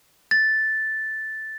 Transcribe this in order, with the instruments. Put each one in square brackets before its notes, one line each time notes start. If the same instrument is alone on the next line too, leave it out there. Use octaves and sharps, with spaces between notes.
[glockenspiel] A6